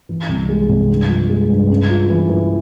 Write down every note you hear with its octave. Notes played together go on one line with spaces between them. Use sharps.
E3
C2
G#3
C3
G2
F3
G#3
G2
C#3
F4
E3
E3